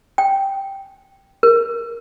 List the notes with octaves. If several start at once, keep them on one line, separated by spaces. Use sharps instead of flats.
G5
A#4